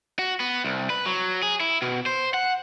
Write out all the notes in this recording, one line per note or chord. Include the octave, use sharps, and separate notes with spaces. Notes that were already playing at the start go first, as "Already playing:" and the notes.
F#4
B3
C2
B4
F#3
G#4
E4
B2
C5
F#5